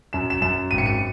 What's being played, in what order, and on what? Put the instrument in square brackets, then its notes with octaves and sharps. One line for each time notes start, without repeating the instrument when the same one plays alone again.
[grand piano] F#2 E7
E7
F#2 E7
G#1 D#7
C#7
D#7